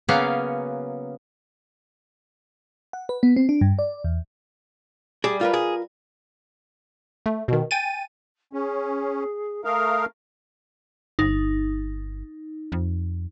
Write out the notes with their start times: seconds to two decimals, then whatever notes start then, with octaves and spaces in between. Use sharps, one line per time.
0.09 C#3 F#3 A#3 B3 C#4 F5
2.93 F#5
3.09 B4
3.23 B3
3.36 C4
3.49 D4
3.61 G2
3.79 D5
4.04 E2
5.24 G3 G#4
5.41 F4 A#4 B4
5.53 G#4
7.26 A3
7.48 B2 D#3
7.71 G5 G#5 A6 D#7
8.53 C#4 G#4
9.64 A3 A#4 F5 D#6
11.19 G1 D#4
12.72 F2